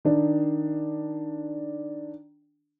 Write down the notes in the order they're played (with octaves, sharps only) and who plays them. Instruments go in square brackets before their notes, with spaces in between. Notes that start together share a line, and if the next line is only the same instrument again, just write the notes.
[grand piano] D#3 D4